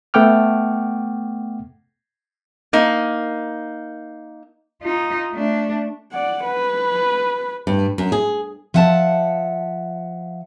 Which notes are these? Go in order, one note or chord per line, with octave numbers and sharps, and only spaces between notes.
A3 B3 F#5 G5 D6 F6
A#3 D#4
D#4 F4
A3 D4
D5 F#5
B4
G2
F#2
G#4
F3 E5 F#5 G#5 A5